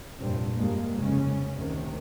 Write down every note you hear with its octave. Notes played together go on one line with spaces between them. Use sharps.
F1 G2 A#2 C4
A#1 G2 G3 G#3 A#3
F1 C#3 G#3 C#4
A1 D2 C3 D#3